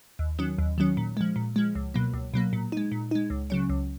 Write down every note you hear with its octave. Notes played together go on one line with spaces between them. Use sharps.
D#2
D#3 F#3 C#4
D#2
D#3 F#3 C#4
A#2
F3 G#3
A#2
F3 G#3
C#2
B2 F#3 A#3
C#2
B2 F#3 A#3
A#2
G#3 D#4
A#2
G#3 D#4
C#2
C#3 F#3 C#4
C#2